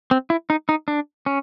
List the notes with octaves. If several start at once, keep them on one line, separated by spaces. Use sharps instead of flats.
C4
E4
D#4
D#4
D4
C#4